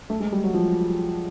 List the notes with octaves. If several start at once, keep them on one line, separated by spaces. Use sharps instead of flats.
A3
G#3
G3
F#3
F3